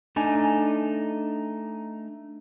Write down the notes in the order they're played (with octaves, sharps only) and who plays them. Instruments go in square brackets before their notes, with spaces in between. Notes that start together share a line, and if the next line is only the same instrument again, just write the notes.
[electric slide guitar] A3 D4 D#4 G#5